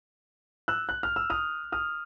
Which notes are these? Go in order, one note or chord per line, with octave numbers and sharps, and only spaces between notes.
E6 F#6
F#6
F6
E6
D#6 F6
D#6 F6